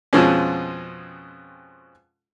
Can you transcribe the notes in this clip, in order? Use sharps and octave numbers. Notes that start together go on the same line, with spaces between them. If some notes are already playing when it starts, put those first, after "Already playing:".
F2 B2 F3 G#3 C4 C#4